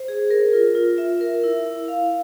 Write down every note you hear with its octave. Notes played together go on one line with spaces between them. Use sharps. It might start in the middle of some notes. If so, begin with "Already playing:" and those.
Already playing: C5
G#4
A#4
F4
F4
E5
A#4
E4
E4
F5